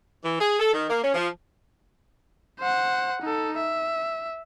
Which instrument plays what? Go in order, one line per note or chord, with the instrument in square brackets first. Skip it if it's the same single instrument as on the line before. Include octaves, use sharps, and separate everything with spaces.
[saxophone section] E3
G#4
A4
D#3
A#3
C#4
F3
[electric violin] C5 F#5
D#4 A4
E5